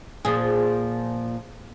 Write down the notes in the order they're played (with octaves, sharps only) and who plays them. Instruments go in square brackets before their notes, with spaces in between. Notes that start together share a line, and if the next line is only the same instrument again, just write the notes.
[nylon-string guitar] A#2 [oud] F3 G#4